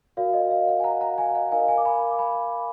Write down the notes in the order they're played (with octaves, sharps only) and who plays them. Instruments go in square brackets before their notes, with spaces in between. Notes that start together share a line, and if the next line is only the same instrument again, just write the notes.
[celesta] F#4 A#4 D5 F5
D#5
F5
D#5 F#5
G#5
F#5 A#5
F#5 A#5
F5 G#5
G#5
D#5 F#5
D#4 A#4 D5 F5 G#5
F5 G#5
D6
G#5 B5
D6
G#5 B5